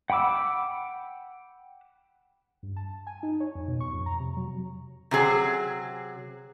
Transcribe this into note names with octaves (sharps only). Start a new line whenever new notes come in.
F#5 G5 B5 D6 E6
G2
A5
G#5
D#4
C#5
F2
B2
C#6
F2
A#5
C3
F#3
C3 F#3 G#4